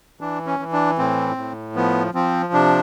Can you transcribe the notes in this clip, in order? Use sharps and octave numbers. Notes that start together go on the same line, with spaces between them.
E3 D4
C#4
E3
D4
A2 C4
A2
F3 B3
F3 C4
C3 D4